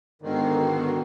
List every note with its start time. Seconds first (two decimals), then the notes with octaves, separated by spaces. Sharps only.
0.22 G#2 D3 D#3 B3 F#4 C7